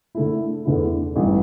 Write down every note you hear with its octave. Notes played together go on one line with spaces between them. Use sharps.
D3 A3 E4
E2 D3 A3 E4
A1 G2 E3